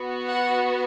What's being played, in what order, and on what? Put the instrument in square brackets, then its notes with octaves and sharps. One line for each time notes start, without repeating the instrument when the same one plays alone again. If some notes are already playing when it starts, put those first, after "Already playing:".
Already playing: [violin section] B3 F#4
F#5